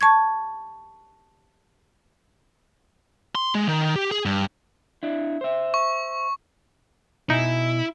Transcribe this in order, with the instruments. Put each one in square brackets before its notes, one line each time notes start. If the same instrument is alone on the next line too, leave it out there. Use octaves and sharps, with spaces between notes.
[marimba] A5 C#6 G#6
[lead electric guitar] C6
G#3
D#3
G4
G#4
G2
[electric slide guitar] D4 E4
C5 E5
[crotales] C#6
[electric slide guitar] B2 D#5 G#5 [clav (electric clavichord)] D#4 [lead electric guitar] E4